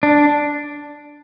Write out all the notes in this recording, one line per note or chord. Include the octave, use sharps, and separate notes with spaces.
D4